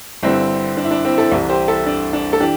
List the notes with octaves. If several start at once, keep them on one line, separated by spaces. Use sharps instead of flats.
G1 G2 D3 C4 E4
D4
E4
D4
C4 E4
E4 A4
C2 C3 E3
G4 C5
E4 A4
D4
D4
A4
E3 D4 G4